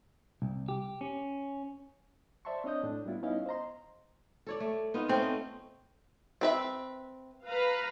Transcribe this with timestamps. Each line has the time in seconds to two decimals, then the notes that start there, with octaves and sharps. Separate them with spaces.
0.42 C2
0.68 G4
1.01 C#4
2.45 C5 D5 E5 A5 C6 C#6
2.64 C4 D4 C#5 D#5 D#6 G6
2.83 A2 D4
3.05 G3 B3 E4 F4
3.23 B3 C#4 D#4 E4 D#5 F5
3.46 C5 D#5 A#5 C6
4.47 A4 C#5 D5
4.60 A3
4.94 B3 D#4 F4
5.09 A3 C4 C#4
5.22 D#5
6.41 C4 B4 E5
7.47 B4 F5 A#5